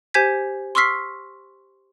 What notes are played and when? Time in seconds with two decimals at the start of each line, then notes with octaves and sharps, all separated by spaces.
0.14 G4 C5 G#5 G6 G#6 B6
0.75 C6 C#6 E6 F6 B6 C7